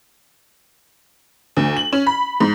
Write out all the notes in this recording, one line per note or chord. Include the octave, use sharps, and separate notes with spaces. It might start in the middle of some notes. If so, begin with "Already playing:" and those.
D2
F#7
C#4
B5
G#2